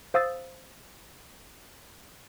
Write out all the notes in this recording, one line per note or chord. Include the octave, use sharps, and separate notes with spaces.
C5 F5 D#6 E6 A6